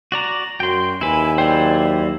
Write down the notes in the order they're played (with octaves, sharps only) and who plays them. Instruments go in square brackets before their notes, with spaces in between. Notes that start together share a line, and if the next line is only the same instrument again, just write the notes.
[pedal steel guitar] F#4 D5 A#5
[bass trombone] F#2 [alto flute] F#4 [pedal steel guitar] G5 C6
[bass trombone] D#2 [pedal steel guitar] E4 B4 [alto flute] G#5
[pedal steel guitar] F#3 E4 C5 [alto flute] D5 [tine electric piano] G5